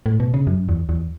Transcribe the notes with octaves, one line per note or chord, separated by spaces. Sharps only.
A2
B2
C#3
F#2
E2
E2